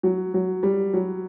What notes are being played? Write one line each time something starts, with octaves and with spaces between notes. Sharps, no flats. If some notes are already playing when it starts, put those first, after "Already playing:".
F#3
F#3
G3
F#3